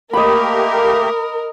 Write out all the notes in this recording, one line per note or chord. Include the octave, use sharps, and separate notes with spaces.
A3 A#3 G4 A#4 D#5 B5